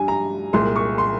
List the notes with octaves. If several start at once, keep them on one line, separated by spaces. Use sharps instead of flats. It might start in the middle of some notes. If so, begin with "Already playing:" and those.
Already playing: G2 G3 G#5
A#5
C2 A#2 G#3 C6
C#6
C6